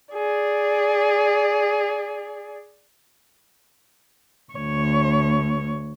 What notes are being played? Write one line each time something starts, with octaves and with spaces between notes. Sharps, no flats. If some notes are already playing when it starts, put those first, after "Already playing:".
G#4 D5
D2 C#5